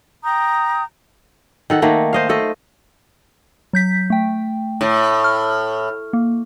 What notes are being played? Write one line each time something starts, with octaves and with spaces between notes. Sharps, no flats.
G5 A#5 D#6 G6
D#3 A4 F#5
D#3 A3 A#3
C5 D#5 F5
A3 A4 D#5
F#3 G6 B6
A3 G5
A2
F6
A#3